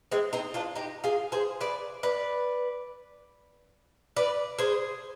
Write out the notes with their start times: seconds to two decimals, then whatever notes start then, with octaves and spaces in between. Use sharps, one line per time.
0.12 G#3 C4
0.33 C4 D#4
0.54 D4 F4
0.76 D#4 G4
1.04 F4 G#4
1.32 G#4 C5
1.61 B4 D5
2.03 B4 D5
4.16 B4 D5
4.58 G#4 C5